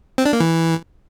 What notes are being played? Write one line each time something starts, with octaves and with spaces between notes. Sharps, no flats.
C4
D4
A#3
E3